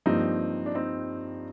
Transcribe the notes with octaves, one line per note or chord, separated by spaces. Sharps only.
G2 F3 A#3 C4 D#4
D4
C4 D#4